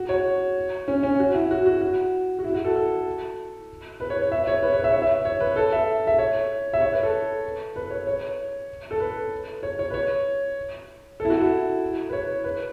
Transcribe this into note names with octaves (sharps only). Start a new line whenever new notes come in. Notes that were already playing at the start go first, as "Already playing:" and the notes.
Already playing: F#4
C#5
C#4
C#4
F#4
E4
F#4
F#4
F#4
F#4
E4
F#4
A4
A4
B4
C#5
C#5
E5
C#5
B4
C#5
E5
C#5
E5
C#5
B4
A4
E5
E5
C#5
E5
C#5
B4
A4
B4
C#5
C#5
A4
B4
C#5
C#5
B4
C#5
A4
E4
F#4
E4
B4
C#5
B4